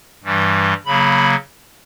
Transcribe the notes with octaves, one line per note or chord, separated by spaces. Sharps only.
G2 E3 G3
C#3 F#3 A#3 B5